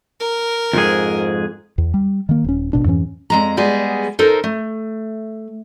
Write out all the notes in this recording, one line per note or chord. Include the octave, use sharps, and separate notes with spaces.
A#4
F2 G#2 G#4
E2
G3
D#3 A#3
D#1 C#4
G#1 B2 D4
F2 G#2 E3 C#4
F2 G#3 A#5
G3 G#3 B3 G#4
D#4 A4 A#4 C5
A3